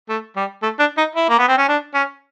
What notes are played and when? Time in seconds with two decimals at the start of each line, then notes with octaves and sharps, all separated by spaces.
0.09 A3
0.36 G3
0.63 A3
0.79 D4
0.97 D#4
1.15 E4
1.29 A#3
1.38 B3
1.48 C4
1.58 C#4
1.68 D4
1.94 C#4